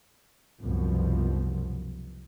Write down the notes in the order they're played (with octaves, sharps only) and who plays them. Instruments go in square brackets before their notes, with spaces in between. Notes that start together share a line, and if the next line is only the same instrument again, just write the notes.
[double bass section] C2 F#2 B2 F3